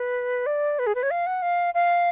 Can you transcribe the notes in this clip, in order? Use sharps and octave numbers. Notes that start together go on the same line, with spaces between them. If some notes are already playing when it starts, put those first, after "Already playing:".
Already playing: B4
D5
B4
G#4
B4
C#5
F5
F#5
F5
F5